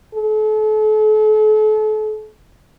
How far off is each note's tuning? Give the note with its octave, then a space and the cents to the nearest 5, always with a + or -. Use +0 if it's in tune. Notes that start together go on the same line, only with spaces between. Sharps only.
A4 -40